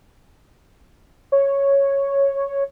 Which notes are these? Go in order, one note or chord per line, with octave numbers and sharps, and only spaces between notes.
C#5